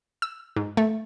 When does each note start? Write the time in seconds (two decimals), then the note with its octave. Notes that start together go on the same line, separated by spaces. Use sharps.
0.22 E6
0.56 G#2
0.77 A3